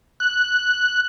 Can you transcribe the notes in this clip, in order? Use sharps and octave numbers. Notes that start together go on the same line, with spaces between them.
F#6